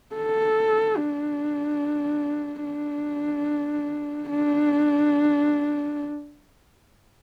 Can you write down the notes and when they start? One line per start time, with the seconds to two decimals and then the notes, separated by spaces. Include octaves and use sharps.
0.15 A4
0.98 D4
2.64 D4
4.30 D4